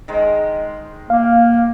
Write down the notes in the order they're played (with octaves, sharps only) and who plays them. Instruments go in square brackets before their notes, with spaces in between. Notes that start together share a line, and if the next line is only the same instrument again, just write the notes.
[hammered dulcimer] D#3 G#3 C5
[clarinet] A#3 [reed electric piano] F5